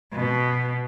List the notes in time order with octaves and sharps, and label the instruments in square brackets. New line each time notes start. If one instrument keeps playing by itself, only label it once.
[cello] B2